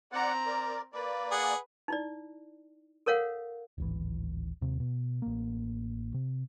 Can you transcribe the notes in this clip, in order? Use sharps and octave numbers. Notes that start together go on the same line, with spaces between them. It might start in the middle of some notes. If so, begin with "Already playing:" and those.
C4 D5 F#5 A#5
A#4 D5
A#3 B4 D5
G#4 F#5
D#4 E4 D5
A4 A#4 C#5 F5 F#5
D1 G#1 E3
D#2 C3
B2
A1 A#3
C3